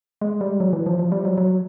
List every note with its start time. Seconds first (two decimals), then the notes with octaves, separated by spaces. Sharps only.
0.21 G#3
0.41 G3
0.60 F#3
0.73 E3
0.86 F3
0.99 F3
1.12 G3
1.25 F#3
1.38 F#3